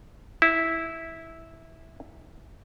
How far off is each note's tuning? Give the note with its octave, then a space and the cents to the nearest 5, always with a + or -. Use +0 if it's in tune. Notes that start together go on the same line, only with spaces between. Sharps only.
E4 -10